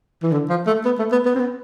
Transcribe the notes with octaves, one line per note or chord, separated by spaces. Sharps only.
E3
D3
F3
A3
B3
A3
B3
B3
C4
B3